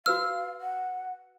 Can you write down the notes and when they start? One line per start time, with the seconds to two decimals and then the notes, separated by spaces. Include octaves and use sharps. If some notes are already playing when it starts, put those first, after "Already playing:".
0.06 F#4 B4 F5 E6 F6
0.61 F#5